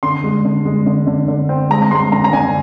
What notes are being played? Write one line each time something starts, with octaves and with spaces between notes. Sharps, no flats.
D3 C6
G#3
D3
G#3
D3
D3
D3
C4
G#3 A#5
A#5
G#3 C6
D3 A#5
A#5
D3 G#5